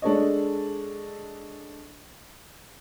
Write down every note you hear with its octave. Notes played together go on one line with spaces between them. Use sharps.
G#3 D4 A4 C#5 D#5